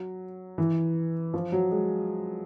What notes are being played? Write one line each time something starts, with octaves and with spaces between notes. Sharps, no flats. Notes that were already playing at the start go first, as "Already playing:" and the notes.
Already playing: F#3
E3
F3
F#3
G#3